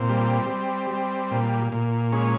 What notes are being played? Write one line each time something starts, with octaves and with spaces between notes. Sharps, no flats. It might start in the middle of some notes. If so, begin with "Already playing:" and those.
Already playing: A#2 C4
G3
G3
G3
A#2
A#2
G#3 C#4